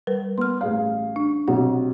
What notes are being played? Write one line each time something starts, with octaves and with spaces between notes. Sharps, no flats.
G3 A#4 B4
B3 C6 F6
A1 G#4 F5
D4
B1 C3 F#5